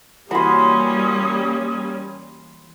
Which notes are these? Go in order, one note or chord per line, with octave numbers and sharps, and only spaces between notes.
E3 G3 A#3 C#4 F#4 B5 C6 D#6